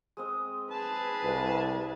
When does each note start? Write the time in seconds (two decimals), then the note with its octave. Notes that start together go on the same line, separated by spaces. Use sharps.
0.17 G#3 C4 D#5
0.71 G#4 B4 A5
1.23 C2